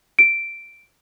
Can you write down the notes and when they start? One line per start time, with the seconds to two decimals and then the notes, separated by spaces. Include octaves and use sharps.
0.19 D7